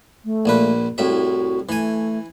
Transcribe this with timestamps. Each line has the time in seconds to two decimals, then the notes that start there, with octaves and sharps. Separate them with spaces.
0.25 A3
0.45 A#1 A#2 B4
0.98 C2 A2 F#4 E5
1.69 E3 A3 G#5